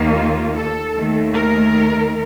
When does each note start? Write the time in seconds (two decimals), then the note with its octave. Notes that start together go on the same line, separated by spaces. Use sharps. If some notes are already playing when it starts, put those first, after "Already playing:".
Already playing: D#2 D#3 A#3
0.13 F4
0.55 A4
0.96 D#2 D#3 A3
1.38 A#4